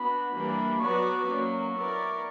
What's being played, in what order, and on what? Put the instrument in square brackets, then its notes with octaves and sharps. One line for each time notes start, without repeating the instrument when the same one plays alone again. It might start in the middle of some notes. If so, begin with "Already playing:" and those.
Already playing: [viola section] B3 D4 F#4 [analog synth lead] B5
[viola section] E3 G3 A#3 D4
[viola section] F#3 B3 F#4 B4 D5 [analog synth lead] C#6
[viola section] F#3 A#3 C#4
B3 E4 A#4 D5